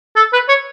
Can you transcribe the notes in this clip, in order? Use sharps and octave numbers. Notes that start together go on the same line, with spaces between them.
A4
B4
C#5